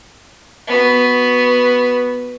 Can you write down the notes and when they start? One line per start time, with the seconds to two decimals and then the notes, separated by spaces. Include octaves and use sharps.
0.68 B3 F#4